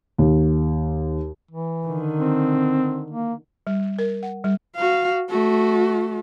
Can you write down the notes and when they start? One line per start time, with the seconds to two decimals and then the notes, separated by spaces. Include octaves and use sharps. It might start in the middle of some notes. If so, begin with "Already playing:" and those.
0.18 D#2
1.51 E3
1.87 D3 D#3
2.19 C4
3.11 A#3
3.67 G3
3.99 A#4
4.23 F#5
4.44 G3
4.76 F#4 F5
5.30 A3 F#4